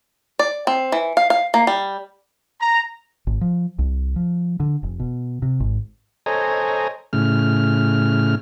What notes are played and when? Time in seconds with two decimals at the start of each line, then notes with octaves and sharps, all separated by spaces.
0.39 D5
0.67 C4
0.92 E3
1.17 F5
1.30 F5
1.54 A#3
1.67 G3
2.61 A#5
3.27 G#1
3.41 F3
3.79 C2
4.16 F3
4.60 D3
4.83 F1
5.00 B2
5.42 C3
5.60 G#1
6.26 A4 C5 C#5 D#5 G#5 A#5
7.13 A2 C#3 F6